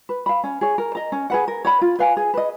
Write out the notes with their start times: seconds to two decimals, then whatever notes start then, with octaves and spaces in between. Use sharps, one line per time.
0.09 B4
0.26 F5 B5
0.44 C#4
0.61 G#4 C#5
0.78 A#4
0.95 D#5 A#5
1.12 C#4
1.30 G#4 B4 F#5
1.48 A#4
1.65 C#5 F#5 B5
1.81 F4
1.99 B4 F5 G#5
2.17 G#4
2.34 B4 D#5